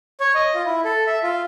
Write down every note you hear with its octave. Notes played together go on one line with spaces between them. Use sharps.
C#5
D#5
F4
E4
A4
E5
F4